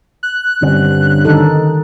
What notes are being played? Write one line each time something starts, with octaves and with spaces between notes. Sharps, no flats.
F#6
G2 D3 C4 C#4
D#3 D#4 A4